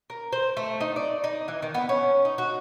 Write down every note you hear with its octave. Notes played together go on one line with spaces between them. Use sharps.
A#4
C5
A3
D#4
D5
D#4
E3
D#3
B3
C#4
D#4
F#4